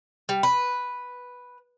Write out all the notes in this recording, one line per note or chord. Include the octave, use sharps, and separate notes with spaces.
G3
B4